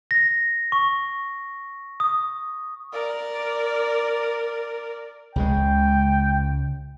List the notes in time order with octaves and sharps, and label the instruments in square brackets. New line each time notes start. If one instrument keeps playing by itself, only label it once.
[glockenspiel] A#6
C#6
D#6
[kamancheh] A#4 D5
[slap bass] C#2 C#3 G#3 [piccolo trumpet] G5